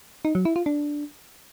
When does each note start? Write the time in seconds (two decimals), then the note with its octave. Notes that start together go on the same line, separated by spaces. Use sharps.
0.25 D#4
0.35 F#3
0.45 E4
0.56 F4
0.66 D4